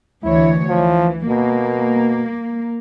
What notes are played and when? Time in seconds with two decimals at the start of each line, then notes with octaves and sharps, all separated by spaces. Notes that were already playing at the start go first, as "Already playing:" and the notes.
0.23 D2 E3 E4 C#5
0.69 E3 F3
1.28 B2 A#3